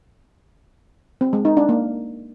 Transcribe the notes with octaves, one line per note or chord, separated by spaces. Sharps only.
C4
G#3
D#4
D4
A#3